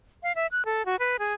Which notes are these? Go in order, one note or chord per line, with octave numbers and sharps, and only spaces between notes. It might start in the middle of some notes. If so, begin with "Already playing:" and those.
F5
E5
F#6
A4
F#4
B4
G#4